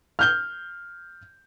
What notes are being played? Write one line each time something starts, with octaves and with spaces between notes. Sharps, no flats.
F6 G6 G7